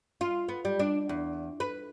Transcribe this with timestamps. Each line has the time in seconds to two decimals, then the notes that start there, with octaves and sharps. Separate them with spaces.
0.21 F4
0.49 B3
0.65 G3
0.80 D4
1.09 E2
1.60 B4